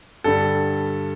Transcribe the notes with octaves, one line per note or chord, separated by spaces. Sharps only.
G2 D3 G3 A4